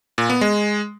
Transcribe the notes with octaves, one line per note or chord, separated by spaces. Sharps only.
A#2
B3
G#3